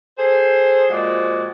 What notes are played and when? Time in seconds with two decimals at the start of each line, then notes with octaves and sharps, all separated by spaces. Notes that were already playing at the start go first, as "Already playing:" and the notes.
0.17 G#4 A4 C5
0.90 A#2 F3 G#3 F#4 D5